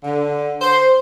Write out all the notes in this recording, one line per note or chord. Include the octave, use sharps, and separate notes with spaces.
D3
C5